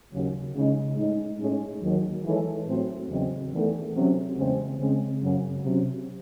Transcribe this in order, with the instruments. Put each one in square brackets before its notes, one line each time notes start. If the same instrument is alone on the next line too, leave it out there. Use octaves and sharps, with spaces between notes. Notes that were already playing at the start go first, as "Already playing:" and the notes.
[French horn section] D#2 C#3 F#3
C#3 G#3 D#4
A2 G#3 D#4
A2 G#3 C#4 G#4 C#5
D#2 D#3 F#3
E3 G#3 D#4 A4 C#5
A2 F#3 C4 F#4 C5
E2 C#3 F#3 C4 D#4
E2 D#3 A3
C3 F#3 C#4
E2 C#3 G#3 C4
C#3 G#3 C4
F#2 C#3 F#3
C3 F#3 C#4